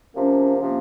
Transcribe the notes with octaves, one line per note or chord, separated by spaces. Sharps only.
C3 F3 A#3 C#4
C3 F3 A#3 C#4